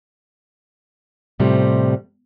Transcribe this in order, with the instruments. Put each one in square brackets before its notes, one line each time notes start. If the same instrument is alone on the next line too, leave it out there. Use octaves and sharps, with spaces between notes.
[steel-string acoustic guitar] A2 C3 F3 G3